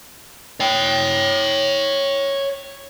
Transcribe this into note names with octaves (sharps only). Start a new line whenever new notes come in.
C#5 G5